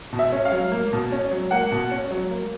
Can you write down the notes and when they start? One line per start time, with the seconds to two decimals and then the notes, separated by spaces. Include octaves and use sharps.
0.13 B2
0.19 E5
0.32 C#4
0.45 F5
0.52 F#3
0.72 A#3
0.93 B2
1.12 C#4
1.31 F#3
1.51 A#3 F#5
1.72 B2
1.91 C#4
2.11 F#3
2.30 A#3